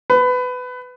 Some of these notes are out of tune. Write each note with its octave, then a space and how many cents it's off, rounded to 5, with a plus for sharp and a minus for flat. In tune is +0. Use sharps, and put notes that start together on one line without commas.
B4 +20